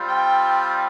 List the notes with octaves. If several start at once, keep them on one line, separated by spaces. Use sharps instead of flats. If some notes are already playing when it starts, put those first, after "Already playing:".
Already playing: G3 C4 F4
G5